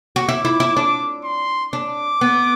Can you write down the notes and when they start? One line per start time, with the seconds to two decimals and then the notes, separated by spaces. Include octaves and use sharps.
0.16 F#4
0.28 E4 D6
0.45 E4
0.60 E4
0.77 D4
1.24 C6
1.73 D4 D6
2.21 B3